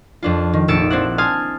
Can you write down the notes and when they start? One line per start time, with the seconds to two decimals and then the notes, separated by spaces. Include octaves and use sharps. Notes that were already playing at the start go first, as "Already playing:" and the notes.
0.23 F2 D4 F4
0.53 D#3
0.68 F1 A#1 E6 A6 C#7 D7
0.90 C4 D4 E4 F#5
1.18 G#5 A5 C6 D#6 F6